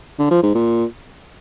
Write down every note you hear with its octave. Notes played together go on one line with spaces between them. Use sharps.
D3
F3
G#2
A#2